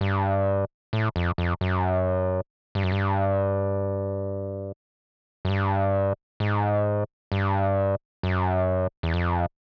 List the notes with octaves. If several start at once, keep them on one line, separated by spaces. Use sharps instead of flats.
G2
A2
F2
F2
F#2
G2
F#2
G2
F#2
G2
G#2
G2
F#2
E2
F2